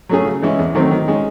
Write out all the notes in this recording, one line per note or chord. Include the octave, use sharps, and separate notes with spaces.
F#3 A3 C#4 G#4
C#3
E3 G#3 C#4 E4
E2
D#3 F#3 A3 C4
D#3
G#3 C#4